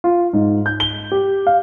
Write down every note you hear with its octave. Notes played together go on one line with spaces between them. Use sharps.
F4
G#2
G6
G7
G4
F5